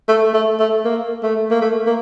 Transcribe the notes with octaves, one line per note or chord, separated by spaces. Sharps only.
A3
A3
A3
A#3
A3
A#3
A3
A#3